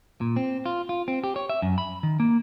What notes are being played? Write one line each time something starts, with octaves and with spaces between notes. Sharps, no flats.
A#2
C4
F4
F4
C4
G4
C#5
E5
F#2
B5
D#3
A#3